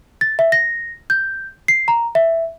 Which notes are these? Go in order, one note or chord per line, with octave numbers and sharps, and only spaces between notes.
A6
E5
A#6
G6
C7
A#5
E5